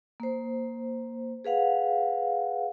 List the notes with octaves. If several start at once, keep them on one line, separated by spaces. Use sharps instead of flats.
A#3 C5
G#4 B4 F5 F#5